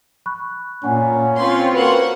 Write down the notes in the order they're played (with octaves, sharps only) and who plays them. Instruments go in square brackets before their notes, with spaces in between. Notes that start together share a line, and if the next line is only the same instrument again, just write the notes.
[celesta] B5 C#6 F#6
[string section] A#2 [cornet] C#4 [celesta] F#5 G#5
[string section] C4 F4 C#5 [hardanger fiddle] B4 C6
[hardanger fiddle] A#3 F#5 [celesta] F#4 F#7 [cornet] B4